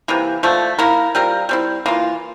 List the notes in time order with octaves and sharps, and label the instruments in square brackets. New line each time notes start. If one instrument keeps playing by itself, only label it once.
[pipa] C3 E3 A#3
D3 F3 A3
A#3 E4 A#4
G3 C4 F4 A#4
G3 C4 E4
E3 A#3 F4